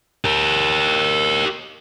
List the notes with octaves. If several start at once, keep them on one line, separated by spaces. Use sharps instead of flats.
G4 A#4